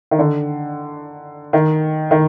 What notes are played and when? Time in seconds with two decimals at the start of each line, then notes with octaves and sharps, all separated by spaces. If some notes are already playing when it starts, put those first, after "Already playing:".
0.11 D#3
0.19 D3
1.53 D#3
2.11 D#3